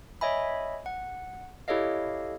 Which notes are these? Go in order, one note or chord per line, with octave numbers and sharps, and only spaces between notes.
C#5 D#5 E5 G#5 B5
F#5
E4 G4 A4 C#5 D#5 F5